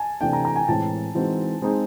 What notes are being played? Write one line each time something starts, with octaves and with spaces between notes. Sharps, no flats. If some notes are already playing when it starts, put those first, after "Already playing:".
Already playing: G#5 A5
C3 E3 A3 D4 G5
A#5
A#5
G#5
A2 E3 G#3 C4 A5
E3 G#3 C4 D#4 F#4
G#3 C4 D#4 G#4